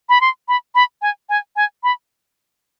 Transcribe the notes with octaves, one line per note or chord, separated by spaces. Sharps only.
B5
C6
B5
B5
G#5
G#5
G#5
B5